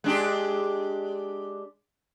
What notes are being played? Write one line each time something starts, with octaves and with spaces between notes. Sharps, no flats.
G#3 D4 G4